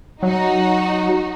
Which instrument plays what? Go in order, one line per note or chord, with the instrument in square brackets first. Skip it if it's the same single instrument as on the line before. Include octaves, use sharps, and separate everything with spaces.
[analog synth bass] F#3 [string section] D#4 F#4